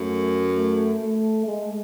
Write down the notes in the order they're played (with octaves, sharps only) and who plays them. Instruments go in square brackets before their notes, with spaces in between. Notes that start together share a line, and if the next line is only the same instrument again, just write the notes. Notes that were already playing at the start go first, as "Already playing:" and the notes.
Already playing: [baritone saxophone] F#2 [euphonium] A3
[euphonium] A3
A3
G#3